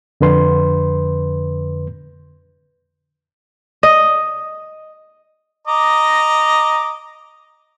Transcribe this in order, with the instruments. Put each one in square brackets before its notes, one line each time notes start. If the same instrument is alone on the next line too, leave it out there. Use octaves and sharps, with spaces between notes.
[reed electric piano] F2 D3 B4 C6
[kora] D#5
[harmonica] D#5 A#5 D6